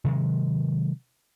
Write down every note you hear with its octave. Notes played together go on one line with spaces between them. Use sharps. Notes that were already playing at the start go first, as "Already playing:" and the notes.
C3 D#3 F#3 G#3